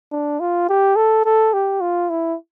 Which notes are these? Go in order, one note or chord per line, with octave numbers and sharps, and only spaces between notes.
D4
F4
G4
A4
A4
G4
F4
E4